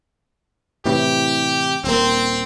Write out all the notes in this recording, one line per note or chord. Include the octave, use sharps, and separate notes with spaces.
A2 C3 E3 G4
D#1 A#3 C4